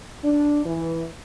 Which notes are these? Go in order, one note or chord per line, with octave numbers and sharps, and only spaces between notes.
D4
E3